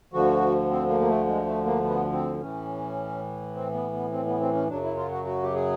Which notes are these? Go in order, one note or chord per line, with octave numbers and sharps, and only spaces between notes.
D2 D3 F3 F#4
C4
A#3
A#3
A3
G#3
A3
A#3
B3
C4
A2 E3 C#4
C4
B3
B3
C4
B3
C4
C#4
F#2 C#3 F#3 D4
E4
F4
F#4
F#4
G4
G#4